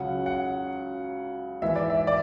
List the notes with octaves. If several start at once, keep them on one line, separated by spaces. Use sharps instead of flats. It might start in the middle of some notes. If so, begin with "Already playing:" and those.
Already playing: C#2 C#3 F#3 F#5
F#5
G#2 E3 E5
D5
E5
D5